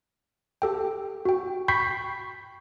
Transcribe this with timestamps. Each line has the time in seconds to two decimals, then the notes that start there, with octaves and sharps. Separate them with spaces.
0.62 G4 A4 G5
1.25 F#4 G5
1.68 G5 B5 C#6 G6 B6 C7